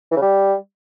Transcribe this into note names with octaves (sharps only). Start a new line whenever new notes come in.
E3
C#3
G3